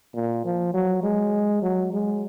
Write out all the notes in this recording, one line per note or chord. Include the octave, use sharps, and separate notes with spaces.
A#2
F3
F#3
G#3
F#3
G#3